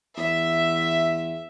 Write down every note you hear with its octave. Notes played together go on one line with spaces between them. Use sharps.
E2 E5